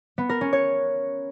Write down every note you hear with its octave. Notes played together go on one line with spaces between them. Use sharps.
B3
A#4
C#4
C#5